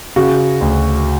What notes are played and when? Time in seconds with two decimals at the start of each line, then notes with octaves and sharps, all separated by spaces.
0.16 C#3 F#4
0.61 D2